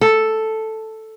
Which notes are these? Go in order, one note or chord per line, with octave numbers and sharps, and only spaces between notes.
A4